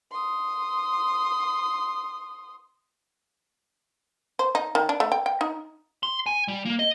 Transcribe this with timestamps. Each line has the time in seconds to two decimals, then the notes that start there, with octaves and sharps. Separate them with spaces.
0.12 C6 D#6
4.39 C5
4.55 D#4
4.75 D#3
4.89 D4
5.00 A3
5.12 G5
5.26 G5
5.41 D#4
6.03 C6
6.26 G#5
6.48 G3
6.65 A#3
6.79 D#5